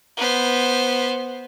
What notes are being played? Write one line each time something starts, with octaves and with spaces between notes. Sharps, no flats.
B3 C5